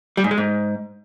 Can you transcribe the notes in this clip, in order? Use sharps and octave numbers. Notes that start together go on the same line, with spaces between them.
G3
G#2
G#3
G#2